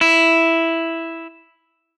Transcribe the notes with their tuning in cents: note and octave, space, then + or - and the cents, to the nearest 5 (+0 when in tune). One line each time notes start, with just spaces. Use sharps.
E4 +0